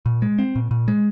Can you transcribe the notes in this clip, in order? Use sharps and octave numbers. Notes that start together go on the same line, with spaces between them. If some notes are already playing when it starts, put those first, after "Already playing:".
A#2
G#3
C4
A#2
A#2
G#3